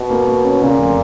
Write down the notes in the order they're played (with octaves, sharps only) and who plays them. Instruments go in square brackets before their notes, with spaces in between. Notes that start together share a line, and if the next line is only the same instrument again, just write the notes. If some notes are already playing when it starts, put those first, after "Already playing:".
Already playing: [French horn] B2
[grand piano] A#3
A#3
C#4
[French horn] A#2 [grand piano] C#3
[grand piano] F1